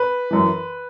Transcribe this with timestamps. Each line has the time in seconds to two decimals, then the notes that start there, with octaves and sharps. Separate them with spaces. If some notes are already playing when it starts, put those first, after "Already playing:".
Already playing: B4
0.31 F#2 E3